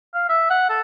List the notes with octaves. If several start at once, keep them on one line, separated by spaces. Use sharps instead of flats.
F5
E5
F#5
A4